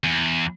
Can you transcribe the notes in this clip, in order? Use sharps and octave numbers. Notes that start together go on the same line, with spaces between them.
E2